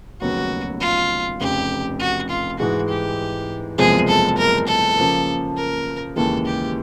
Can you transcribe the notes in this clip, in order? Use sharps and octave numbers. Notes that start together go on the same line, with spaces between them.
F1 D#2 C#3 F#3 B3 F#4
F4
F1 F2 C#3 G4
F#4
F4
G#2 E3 G#3 F#4
G4
F#1 E2 C3 F3 G#3 G#4
A4
A#4
A4
C#3 F3 A#3
A#4
D#2 C#3 E3 G#3 A4
G4